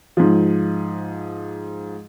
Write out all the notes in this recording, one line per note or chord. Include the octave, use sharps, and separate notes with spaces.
G#2 F3